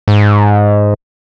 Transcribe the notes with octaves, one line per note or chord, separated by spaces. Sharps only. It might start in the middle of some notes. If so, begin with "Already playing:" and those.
G#2